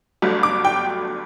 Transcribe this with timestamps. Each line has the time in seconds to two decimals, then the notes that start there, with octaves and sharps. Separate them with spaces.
0.22 G1 G2 F#3 A3
0.43 D6
0.65 G5